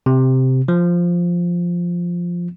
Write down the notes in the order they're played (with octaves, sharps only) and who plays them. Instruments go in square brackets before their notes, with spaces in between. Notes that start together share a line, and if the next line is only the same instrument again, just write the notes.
[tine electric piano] C3
F3